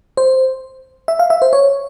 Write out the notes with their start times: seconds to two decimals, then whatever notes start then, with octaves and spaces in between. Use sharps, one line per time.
0.17 C5
1.08 E5
1.19 F5
1.30 E5
1.42 C5
1.53 C#5